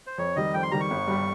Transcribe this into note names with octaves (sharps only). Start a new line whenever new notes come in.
C5
F2 C#5
D#3 G3 D#5
F2 G5
C6
D#3 G3 A#5
C#6
G1
G2 G3